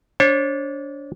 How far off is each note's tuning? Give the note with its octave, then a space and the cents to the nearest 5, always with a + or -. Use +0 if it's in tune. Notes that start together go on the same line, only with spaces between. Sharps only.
D4 -25 C#5 -45